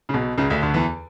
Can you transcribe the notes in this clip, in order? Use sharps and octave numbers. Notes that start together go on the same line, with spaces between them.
C#3
B1 B2
C#2 C#3
D2 D3
D2 D3
E2 E3